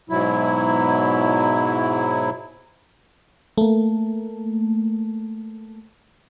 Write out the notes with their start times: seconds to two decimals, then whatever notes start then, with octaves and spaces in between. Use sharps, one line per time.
0.10 G#2 B2 F#3 E4
3.58 A3 A#3